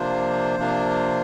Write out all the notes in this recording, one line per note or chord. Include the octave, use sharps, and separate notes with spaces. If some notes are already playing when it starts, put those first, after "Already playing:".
Already playing: C3 F3 A#3 D4 F4 C5
C3 F3 A#3 D4 F4